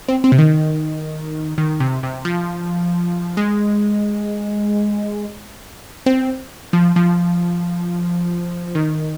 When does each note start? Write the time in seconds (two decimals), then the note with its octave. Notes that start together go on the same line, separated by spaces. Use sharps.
0.08 C4
0.24 C4
0.32 C3
0.38 D#3
1.58 D#3
1.80 C3
2.03 C3
2.25 F3
3.37 G#3
6.06 C4
6.73 F3
6.96 F3
8.75 D#3